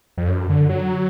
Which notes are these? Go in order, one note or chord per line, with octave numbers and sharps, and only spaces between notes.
F2
F#2
D3
F#3